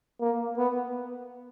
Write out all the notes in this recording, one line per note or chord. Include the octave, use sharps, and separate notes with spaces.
A#3
B3